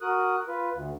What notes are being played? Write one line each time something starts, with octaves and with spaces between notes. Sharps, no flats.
F#4 A#4 D#6 F#6
F4 B4
D2